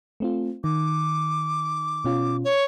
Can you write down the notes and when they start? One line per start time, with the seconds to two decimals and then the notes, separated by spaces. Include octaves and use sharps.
0.20 A3 C4 F4
0.64 D#3 D6
2.05 B2 C#4 F4
2.44 C#5